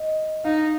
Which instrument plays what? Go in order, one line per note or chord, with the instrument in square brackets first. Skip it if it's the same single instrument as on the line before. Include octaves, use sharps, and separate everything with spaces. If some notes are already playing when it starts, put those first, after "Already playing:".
Already playing: [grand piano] D#5
[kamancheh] D#4 [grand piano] F5